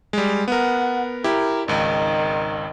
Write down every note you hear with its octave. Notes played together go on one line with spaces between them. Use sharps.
G3 G#3
B3 A#4 F#5
E4 G4 A#4
G#1 C#2 D#3